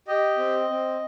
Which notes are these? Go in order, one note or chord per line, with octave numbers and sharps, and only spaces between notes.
G4 D#5
C4
C4